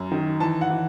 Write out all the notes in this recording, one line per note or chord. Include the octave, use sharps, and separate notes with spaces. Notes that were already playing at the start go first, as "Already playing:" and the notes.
Already playing: F#2
D#3
E3 A5
F#5
E3